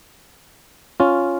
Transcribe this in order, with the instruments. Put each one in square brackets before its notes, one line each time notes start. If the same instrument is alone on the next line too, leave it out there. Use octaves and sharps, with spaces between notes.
[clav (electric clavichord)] C#4 F4